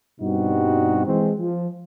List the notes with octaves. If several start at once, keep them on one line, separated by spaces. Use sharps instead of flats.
G2 B2 G3 C4 D#4 F#4
E3 G#3 C4
F3